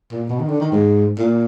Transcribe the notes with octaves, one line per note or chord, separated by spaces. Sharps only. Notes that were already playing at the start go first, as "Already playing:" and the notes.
A#2
B2
D#3
D3
D#3
G#2
A#2